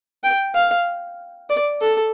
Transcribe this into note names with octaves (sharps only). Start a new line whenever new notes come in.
G5
F5
D5
A4